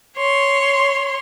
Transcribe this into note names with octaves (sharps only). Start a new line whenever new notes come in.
C#5 C6